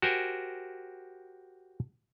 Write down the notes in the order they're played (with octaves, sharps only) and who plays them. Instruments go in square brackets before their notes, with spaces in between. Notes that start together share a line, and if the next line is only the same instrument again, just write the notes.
[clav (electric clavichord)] F#4 G4 A#4 C5 G#5